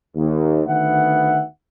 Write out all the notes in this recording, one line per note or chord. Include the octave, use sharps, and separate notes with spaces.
D#2
D2 D#3 B3 E5 F#5